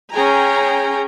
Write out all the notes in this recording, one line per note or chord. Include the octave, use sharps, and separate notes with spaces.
C#4 G#4 G5 G#5 A#5